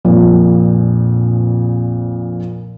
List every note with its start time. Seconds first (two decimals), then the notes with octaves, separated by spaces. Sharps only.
0.05 A#1 F2 A#2